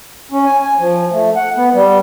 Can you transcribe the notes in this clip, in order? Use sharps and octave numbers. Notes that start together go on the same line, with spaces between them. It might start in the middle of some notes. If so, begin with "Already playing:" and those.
C#4
G#5
G#5
F3
A3
F#5
B3
G3